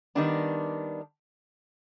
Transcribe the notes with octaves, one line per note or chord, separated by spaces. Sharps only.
D#3 G3 B3 D4